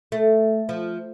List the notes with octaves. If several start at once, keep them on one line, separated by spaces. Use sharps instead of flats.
A3
F3